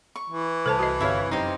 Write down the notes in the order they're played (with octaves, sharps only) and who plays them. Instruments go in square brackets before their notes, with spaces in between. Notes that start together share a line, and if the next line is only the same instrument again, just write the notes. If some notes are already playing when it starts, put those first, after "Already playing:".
[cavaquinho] C#6
[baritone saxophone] E3
[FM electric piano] C2 [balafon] A4 C5 A5
[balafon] F#4 C5 D#5
[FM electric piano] G1 C3 F5 [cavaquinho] E4 C#5
[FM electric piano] F#2 C6 [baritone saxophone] C4 [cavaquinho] D#4 G4